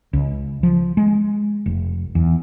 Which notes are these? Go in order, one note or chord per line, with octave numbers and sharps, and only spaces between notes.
C#2
F3
G#3
F1
E2